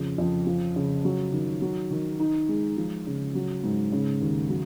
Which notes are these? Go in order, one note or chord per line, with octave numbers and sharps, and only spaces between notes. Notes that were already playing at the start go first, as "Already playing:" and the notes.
Already playing: F2 C#3
F2
F3
C#3
F#3
D#3
F#3
D#3
D#4
G#3
F3
C#3
F#3
G#2
C#3
D#2
F#3